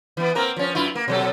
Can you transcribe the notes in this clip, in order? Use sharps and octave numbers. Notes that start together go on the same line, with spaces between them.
E3 B3
A#3 C4 A#4
F3 C#4
F#2 E4 F4
A#3
B2 F#3 A4